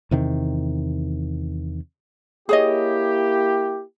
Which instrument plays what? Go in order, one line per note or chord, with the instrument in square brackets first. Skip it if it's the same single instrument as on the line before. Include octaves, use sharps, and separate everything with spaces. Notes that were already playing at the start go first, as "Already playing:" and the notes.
[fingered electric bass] E2 C3 D#3
[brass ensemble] A#3 E4 G4 [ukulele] G#4 C#5 D#5